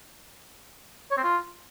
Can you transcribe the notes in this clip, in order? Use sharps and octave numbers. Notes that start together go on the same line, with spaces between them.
C#5
C4
F4